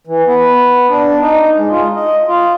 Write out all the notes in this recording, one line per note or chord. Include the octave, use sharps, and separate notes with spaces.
E3
B3
D4
D#4
G#3
F4
D#5
F4